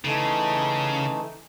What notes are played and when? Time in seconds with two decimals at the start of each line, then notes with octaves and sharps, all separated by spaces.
0.05 C#3 E3 A3 D#4